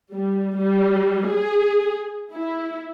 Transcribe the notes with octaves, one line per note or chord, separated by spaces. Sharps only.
G3
G3
G#4
E4